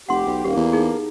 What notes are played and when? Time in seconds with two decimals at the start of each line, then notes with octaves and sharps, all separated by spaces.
0.09 F1 G4 F#5 C6
0.26 B1
0.44 D#1 A#3 G4
0.56 E2
0.73 D#4 G#4